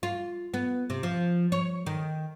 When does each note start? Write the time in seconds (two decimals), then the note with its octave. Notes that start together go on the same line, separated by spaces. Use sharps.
0.03 F4
0.54 B3
0.90 C3
1.03 F3
1.52 C#5
1.86 D#3